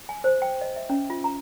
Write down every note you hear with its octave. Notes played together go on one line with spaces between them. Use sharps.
G#5
C5
G5
D#5
E5
C#4
F4
A#5